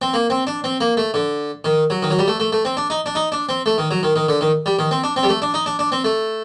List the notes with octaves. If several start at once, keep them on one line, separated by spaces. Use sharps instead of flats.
C4
A#3
C4
D4
C4
A#3
A3
D3
D#3
F#3
D#3
F#3
G3
A3
A3
A3
C4
D4
D#4
D4
D#4
D4
C4
A3
D#3
F#3
D#3
D#3
D3
D#3
G3
D#3
C4
D4
C4
G3
A3
D4
D#4
D4
D4
C4
A3